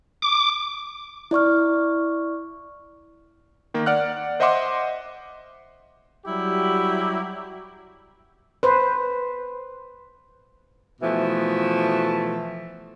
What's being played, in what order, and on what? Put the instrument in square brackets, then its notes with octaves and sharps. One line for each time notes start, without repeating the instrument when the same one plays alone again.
[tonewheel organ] D6
[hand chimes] E4 D5 C#6 F6
[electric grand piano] D#3 A#3
D5 F#5 F6 F#6
C5 D#5 E5 F#5 C6 D6
[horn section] F#3 G3 E4 F#4 G4
[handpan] B4 C5
[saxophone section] B2 E3 F3 A3